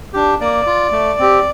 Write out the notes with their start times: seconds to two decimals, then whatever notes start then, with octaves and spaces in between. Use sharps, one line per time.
0.13 D4 G4
0.41 A#3 D5
0.67 F4
0.92 A3
1.19 C4 G4